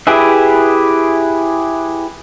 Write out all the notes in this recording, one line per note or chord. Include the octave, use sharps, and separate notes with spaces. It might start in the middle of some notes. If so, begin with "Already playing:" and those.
E4 G4 G#4 B4 E5